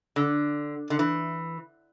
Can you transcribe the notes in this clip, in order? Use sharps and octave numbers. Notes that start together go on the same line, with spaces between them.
D3
D3
E3